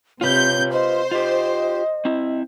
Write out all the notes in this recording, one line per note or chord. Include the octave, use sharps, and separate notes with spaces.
C3 F4 B4 C#5 G6
C5 D#5
F4 G4 D#5
C4 E4